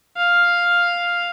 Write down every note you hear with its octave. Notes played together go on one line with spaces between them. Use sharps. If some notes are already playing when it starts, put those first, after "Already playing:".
F5